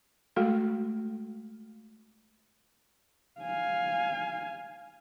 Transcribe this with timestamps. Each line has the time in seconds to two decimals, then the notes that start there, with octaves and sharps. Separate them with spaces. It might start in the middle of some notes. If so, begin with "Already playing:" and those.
0.36 G#3 A3 F#4 A4
3.40 F5 G#5